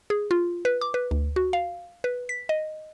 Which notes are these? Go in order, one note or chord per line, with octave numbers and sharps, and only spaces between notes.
G#4
F4
B4
D6
B4
D2
F#4
F5
B4
B6
D#5